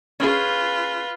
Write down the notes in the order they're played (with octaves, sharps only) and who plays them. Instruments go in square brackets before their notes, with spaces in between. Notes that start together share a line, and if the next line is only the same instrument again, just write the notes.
[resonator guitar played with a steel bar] C#4 G#4 [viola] F4 B4